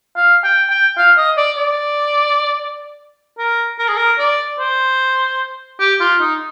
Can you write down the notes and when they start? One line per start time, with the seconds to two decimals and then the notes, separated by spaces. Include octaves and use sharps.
0.16 F5
0.44 G5
0.70 G5
0.98 F5
1.18 D#5
1.37 D5
1.57 D5
3.38 A#4
3.79 A#4
3.88 G#4
3.97 A#4
4.19 D5
4.59 C5
5.79 G4
6.00 F4
6.20 D#4